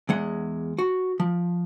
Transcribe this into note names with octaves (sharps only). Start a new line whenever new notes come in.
E2 G#3 F#5
F#4
F3